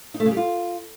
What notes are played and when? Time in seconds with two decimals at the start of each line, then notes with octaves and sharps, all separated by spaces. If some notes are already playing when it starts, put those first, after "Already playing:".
0.14 D#4
0.20 A3
0.26 C#3
0.31 G3
0.37 F4